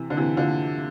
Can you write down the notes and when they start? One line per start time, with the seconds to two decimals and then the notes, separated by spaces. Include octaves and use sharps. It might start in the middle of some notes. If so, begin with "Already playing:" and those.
Already playing: C3 E3
0.10 D3
0.17 C3 E3
0.37 D3 F3